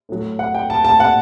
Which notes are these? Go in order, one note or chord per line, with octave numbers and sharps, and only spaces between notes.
A2 F#3
F#5
G5
A5
A5
F#5